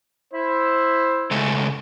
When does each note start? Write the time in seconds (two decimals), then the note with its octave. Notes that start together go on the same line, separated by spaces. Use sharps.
0.33 E4 C5
1.31 C#3 G#3 A3